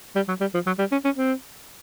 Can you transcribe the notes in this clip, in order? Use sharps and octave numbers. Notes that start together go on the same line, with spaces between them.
G3
F#3
G3
F3
F#3
G3
C#4
C#4
C4